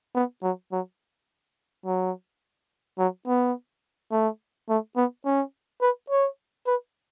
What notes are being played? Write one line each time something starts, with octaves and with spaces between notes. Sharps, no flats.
B3
F#3
F#3
F#3
F#3
B3
A3
A3
B3
C#4
B4
C#5
B4